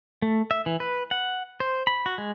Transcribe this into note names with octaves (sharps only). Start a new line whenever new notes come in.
A3
E5
E3
B4
F#5
C5
B5
F#4
G#3